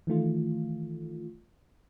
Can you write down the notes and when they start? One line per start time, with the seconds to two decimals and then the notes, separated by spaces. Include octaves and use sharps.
0.07 D#3 E3 A3 F4